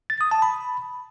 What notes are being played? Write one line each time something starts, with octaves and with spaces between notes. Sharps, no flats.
A6
D#6
A5
B5